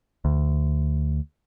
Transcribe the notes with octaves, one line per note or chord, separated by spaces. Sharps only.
D2